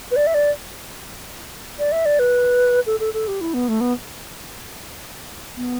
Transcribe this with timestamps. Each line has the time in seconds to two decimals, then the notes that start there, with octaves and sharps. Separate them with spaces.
0.11 B4
0.16 D5
0.27 E5
0.34 D5
1.79 D5
1.92 E5
2.06 D5
2.19 B4
2.86 A4
3.00 A4
3.14 A4
3.28 G4
3.41 E4
3.54 B3
3.68 A3
3.81 B3
5.57 B3